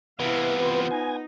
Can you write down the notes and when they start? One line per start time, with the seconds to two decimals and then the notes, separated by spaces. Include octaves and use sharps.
0.19 C3 E3 B3 E4 B4 F5
0.58 F4 C5
0.91 D#4 G#5